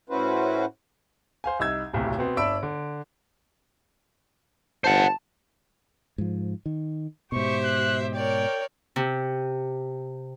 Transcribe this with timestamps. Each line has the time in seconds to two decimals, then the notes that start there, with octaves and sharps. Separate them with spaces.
0.10 A2 C#4 E4 F#4 B4 C5
1.44 C5 F5 G#5
1.59 C2 D#4 E6 G#6
1.94 D1 B1 A2 C3
2.17 B2 B3 C4
2.37 G1 D4 E5 B5 E6 D7
2.63 D3
4.84 G1 C5 F#5 A5
6.18 G#2 F3
6.66 D#3
7.32 G#2 B2 G4 C5 E5 C#6
7.64 F#6
8.14 A#4 C#5 D5 G5
8.96 C3